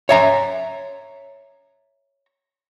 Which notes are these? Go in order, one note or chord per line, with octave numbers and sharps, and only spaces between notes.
C#5 E5 A#5